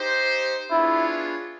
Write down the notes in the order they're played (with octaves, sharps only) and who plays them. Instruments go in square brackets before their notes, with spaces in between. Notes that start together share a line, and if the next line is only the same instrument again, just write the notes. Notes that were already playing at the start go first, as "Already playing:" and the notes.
Already playing: [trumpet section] D#4 G4 C5
[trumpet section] B3 D4 F4 G#4 C#5 [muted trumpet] E4